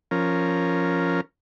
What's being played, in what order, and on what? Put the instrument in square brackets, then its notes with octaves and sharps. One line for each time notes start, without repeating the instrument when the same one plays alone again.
[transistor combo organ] F3 C#4 A#4